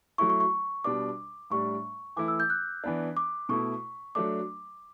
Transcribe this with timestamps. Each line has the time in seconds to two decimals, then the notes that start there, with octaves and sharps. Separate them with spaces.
0.18 F#3 A3 E4 C#6
0.30 C#6
0.40 C#6
0.84 B2 G3 D4 D6
1.50 A2 G3 D4 C#6
2.16 E3 A3 E4 D6
2.28 E6
2.40 G6
2.50 F#6
2.84 E3 B3 D4
3.17 D6
3.49 B2 A3 E4 C#6
4.15 F#3 A3 D4 D6